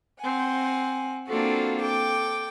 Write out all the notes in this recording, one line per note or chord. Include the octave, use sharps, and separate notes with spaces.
C4 F#5 G#5
A#3 C4 D4 F4 F#4 A4
A4 G5 D6